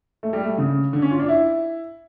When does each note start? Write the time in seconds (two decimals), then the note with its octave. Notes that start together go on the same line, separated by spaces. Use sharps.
0.23 A3
0.33 G3
0.43 A3
0.58 C#3
0.93 D3
1.02 C#4
1.11 F4
1.19 D4
1.29 E4